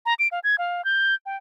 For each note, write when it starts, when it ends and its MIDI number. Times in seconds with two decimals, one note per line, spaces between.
0.06 0.14 82
0.19 0.28 98
0.32 0.40 77
0.44 0.56 92
0.58 0.84 77
0.85 1.15 91
1.26 1.36 79